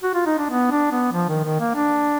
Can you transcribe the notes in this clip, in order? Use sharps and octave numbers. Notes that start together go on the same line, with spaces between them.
F#4
F4
D#4
D4
B3
D4
B3
F3
D#3
D#3
A#3
D4